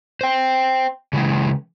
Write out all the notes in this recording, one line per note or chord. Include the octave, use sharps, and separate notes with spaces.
C5 G5
C#3 E3 G#3